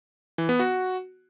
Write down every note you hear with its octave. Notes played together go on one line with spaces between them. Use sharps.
E3
B3
F#4